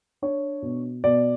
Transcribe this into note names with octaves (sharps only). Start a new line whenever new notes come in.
D4 C#5
B2
B2 D5